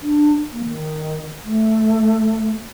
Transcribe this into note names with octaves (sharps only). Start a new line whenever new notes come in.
D4
A#3
D#3
A3